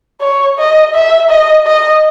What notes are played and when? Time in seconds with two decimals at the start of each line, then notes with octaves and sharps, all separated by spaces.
0.21 C#5
0.58 D#5
0.94 E5
1.30 D#5
1.66 D#5